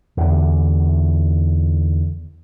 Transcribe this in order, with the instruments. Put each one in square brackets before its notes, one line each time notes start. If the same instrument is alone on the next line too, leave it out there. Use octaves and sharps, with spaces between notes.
[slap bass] E2 D3